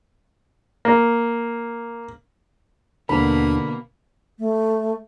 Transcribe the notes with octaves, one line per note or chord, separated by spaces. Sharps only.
A#3
D#2 B2 D3 A#3 D4 B5
A3